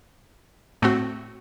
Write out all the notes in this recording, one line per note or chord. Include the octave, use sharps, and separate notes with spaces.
A2 A3 C4 F#4